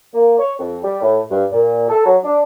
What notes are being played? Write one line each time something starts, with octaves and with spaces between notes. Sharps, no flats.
A#3
C#5
F2
G3
A2
G2
A#2
A4
F#3
D4